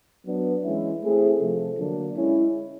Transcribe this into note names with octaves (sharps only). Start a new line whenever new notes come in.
F#3 B3 D4
E3 G#3 C#4 E4
A3 C4 E4 G#4
C3 F3 A3
D3 F#3 A#3 D4
G#3 C#4 E4